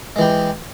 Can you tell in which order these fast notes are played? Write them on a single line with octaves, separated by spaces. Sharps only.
G#3 E3 G4